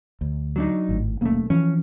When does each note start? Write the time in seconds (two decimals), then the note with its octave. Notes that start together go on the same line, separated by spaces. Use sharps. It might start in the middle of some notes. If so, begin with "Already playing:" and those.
0.21 D2
0.56 F#3 D4 D#4
0.89 G#1 A2
1.21 D#1 B1 A3 A#3 C#4
1.50 E3 F3 C#4